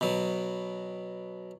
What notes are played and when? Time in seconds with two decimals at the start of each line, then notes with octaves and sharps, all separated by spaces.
0.01 B2 F#3